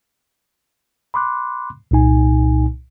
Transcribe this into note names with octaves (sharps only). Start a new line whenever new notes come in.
B5 C6 D6 F#6
C2 A#2 D#4 G#5